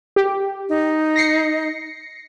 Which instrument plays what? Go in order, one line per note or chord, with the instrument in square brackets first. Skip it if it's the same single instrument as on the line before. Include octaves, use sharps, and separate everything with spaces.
[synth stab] G4
[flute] D#4
[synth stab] A#6 C7 C#7